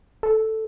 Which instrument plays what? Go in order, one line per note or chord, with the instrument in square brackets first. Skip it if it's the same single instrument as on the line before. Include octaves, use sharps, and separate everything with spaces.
[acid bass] A4